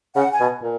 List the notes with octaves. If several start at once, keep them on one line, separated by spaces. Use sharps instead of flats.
C#3 F#5
G#5
B2
A#2